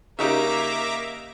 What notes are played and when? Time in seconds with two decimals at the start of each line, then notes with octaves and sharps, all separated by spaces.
0.19 C#3 A#3 D#4 G4 E5 A#5 D6